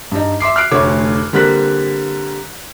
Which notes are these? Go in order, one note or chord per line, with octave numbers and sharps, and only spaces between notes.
G2 D#4
E5 C6 D6 C7
F6 F#6 C7 D7
F1 D2 D3 A3 C#5 D6
D3 G3 A#3 C4 F#6 B6